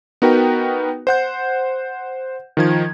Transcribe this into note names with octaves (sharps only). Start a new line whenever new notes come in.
B3 D#4 F#4 A#4 B4 G5
C5 F#5 G6
D#3 F3 G#6